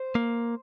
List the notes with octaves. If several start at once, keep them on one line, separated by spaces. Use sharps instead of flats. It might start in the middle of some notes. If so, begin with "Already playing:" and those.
Already playing: C5
A#3